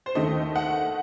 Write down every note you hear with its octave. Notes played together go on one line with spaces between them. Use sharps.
C5
D#2 D#3 A3 D#5
F#5